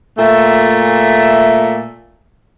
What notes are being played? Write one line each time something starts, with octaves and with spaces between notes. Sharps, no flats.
A#2 A3 E5